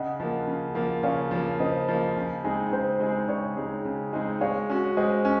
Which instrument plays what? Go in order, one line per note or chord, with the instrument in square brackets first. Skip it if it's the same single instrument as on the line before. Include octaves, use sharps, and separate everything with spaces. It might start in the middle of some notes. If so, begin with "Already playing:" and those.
Already playing: [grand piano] C#3 [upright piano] D#5 F#5
[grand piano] F3 A#3
C#3
F3 A#3
[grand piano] C#3 [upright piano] C#5 F5
[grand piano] F3 A#3
[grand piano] C#3 [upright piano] C5 D#5
[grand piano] F3 A#3
C#3
G#3 C4 D#4 G#4
[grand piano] C#3 [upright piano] C5
[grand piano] G#3 C4 D#4 G#4
[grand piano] C#3 [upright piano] C#5
[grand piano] G#3 C4 D#4 G#4
C#3
G#3 C4 D#4 G#4
[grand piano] G#3 [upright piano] C#5 F5
[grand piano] C#4 F#4
[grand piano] G#3 [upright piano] C5 D#5
[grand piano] C#4